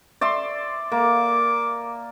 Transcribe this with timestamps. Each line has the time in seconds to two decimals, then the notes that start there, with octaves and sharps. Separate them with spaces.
0.21 D5 E5 C6
0.92 A#3 D6